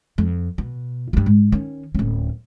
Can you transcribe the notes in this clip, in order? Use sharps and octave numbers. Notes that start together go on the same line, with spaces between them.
F2
B2
G2 F4
G#2
D#3 C#4
D1 C#4